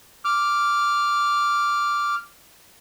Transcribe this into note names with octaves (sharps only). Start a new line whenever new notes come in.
D6 F6